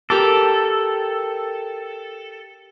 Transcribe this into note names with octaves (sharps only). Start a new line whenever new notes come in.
G4 A4 A#4 D6